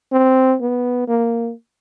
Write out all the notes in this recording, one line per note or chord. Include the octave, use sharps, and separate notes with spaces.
C4
B3
A#3